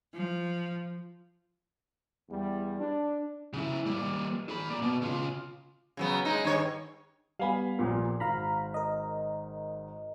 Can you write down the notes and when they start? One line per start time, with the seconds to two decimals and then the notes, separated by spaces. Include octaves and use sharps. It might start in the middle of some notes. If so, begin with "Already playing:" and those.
0.12 F3
2.29 E2 G3
2.79 D4
3.53 C#3 E4
3.86 G3 A#3
4.49 G#4 B5
4.69 A#3 D5
4.82 B2
5.02 C#3 F4
5.97 C#3 F#3 B3
6.25 G#3 D#4
6.44 G2 D#3 C#5
7.39 G3 B3 F5 G#5 B5
7.77 A#1 A#2 A#4
8.20 G#1 F5 A#5 B5
8.74 A#4 D#5